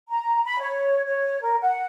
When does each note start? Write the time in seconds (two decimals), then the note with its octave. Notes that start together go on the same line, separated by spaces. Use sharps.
0.09 A#5
0.44 B5
0.60 C#5
1.05 C#5
1.41 A#4
1.61 F#5